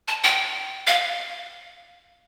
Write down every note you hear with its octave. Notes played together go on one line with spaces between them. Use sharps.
A5
G5
F5